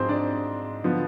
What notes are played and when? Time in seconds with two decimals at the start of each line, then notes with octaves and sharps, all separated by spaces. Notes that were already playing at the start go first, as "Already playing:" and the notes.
Already playing: G#2 F3 G#3 C4 G#4 C5
0.09 D4 D5
0.84 D3 F3 B3